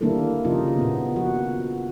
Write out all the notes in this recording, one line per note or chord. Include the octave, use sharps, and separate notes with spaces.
D#3 G3 A#3 D4 E4 A4
C#3 F3 D#4 F4
A#2 B3
F3 F#4